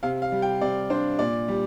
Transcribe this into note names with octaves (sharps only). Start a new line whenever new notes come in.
C3 F5
F5
G3
G5
C3 D5
D4 C5
A#2 D5
G3